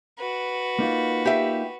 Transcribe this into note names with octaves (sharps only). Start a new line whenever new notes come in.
F#4 B4
A#3 D#4 F4
G4 E5